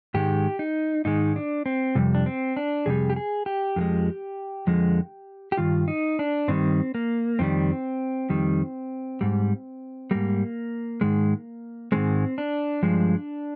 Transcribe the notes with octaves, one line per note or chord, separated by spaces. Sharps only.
G#2 D#3 G#3 G4
D#4
G#2 D#3 G#3 D#4
D4
C4
F2 C3 G3
D4
C4
D4
F2 C3 G3 G#4
G4
G#4
G4
F2 D3 F3 G#3
F2 D3 F3 G#3
G4
G2 D#3 F4
D#4
D4
G2 D#3 G3 C4
A#3
F2 D#3 G3 C4
F2 D#3 G3
G#2 G3
G#2 G3 A#3
G#2 D#3 G#3
G#2 D#3 G#3 C4
D4
G2 F3 G#3